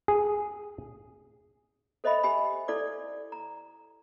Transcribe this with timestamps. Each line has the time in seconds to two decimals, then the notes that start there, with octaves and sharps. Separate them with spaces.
0.08 G#4
2.04 A4 C5 D#5 E5 B5
2.23 G4 G#5 B5
2.68 E4 A4 D5 D6
3.32 A#5